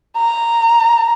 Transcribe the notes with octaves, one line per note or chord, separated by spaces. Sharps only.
A#5